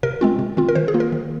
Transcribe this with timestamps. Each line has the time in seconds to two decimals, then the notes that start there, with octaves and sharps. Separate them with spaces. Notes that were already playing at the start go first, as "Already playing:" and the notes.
0.03 C3 A#4
0.21 G#3 C4 F4
0.39 C3
0.57 D#3 C4 F4
0.69 A#4
0.75 D#3 C5
0.88 G#4
0.94 A#3 F4
1.00 A#4
1.12 D#3